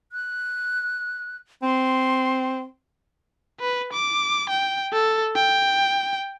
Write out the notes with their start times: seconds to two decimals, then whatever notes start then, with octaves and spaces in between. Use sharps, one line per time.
0.12 F#6
1.63 C4 C6
3.60 B4
3.93 D6
4.49 G5
4.93 A4
5.36 G5